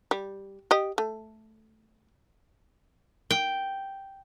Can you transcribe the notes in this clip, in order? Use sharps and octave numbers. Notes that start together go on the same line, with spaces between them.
G3
G4 D#5
A3
G5